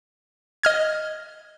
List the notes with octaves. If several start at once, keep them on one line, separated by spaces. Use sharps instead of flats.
D#5 F6 G#6